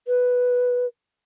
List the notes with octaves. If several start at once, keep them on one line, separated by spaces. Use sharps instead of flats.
B4